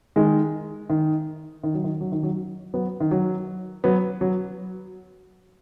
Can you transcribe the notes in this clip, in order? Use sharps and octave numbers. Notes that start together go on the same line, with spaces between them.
D#3 G#3
D#3
D#3
F#3
D#3
F#3
D#3
F#3
F#3 B3
D#3
F#3
F#3 B3
F#3